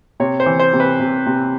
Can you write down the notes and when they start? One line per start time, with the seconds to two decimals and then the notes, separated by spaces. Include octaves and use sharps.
0.20 C3 C#5
0.40 C5
0.46 E3
0.59 C5
0.73 C3
0.80 B4
1.00 C3
1.26 C3